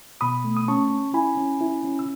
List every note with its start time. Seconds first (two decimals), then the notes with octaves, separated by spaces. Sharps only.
0.21 B2 B5 D#6
0.44 A3
0.57 D#6
0.68 C#4 A5 C#6
0.90 C#4
1.14 E4 G#5 B5
1.37 C#4
1.61 E4
1.84 C#4
1.99 E6